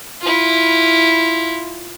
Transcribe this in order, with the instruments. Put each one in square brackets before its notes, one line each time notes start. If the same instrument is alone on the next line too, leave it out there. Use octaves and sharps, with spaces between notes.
[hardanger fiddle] E4 F4